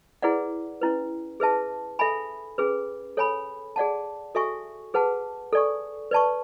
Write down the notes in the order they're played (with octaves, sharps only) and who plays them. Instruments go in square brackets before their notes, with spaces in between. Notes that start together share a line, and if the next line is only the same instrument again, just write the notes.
[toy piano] E4 G#4 B4 D5 F#5
C#4 E4 B4
G#4 B4 E5 A5
A4 E5 G#5 B5
C#4 G#4 B4
A4 C#5 G#5 B5
G#4 D5 F#5 A5
F#4 A4 E5 G#5 C#6
G#4 B4 F#5 A5
A4 D5 G#5 C#6
B4 D5 A5 C#6